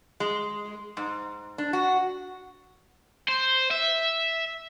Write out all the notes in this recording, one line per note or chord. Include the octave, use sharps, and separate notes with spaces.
G#3
G#2
D4
F#4
C5
E5